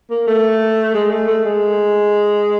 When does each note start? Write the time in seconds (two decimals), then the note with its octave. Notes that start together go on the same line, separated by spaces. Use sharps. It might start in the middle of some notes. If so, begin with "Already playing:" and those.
0.10 A#3
0.28 A3
0.94 G#3
1.11 A3
1.28 A3
1.45 G#3